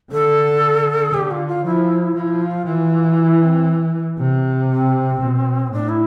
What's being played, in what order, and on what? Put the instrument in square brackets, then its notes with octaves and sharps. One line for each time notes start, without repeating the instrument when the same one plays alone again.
[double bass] D3 [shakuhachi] A4
[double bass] D3 [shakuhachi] G4
[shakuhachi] F4
F4
[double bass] F3 [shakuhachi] E4
[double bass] F3 [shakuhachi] F4
[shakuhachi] E4
F4
[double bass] E3 [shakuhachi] F4
[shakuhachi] E4
C4
[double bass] C3
[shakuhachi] C4
[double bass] B2
[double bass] A2 [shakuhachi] D4
[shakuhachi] E4